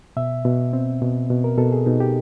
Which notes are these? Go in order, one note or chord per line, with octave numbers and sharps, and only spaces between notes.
B2 E5
B2
C4
B2
B2
A#4
B2 A4
G#4
B2 D#4
G4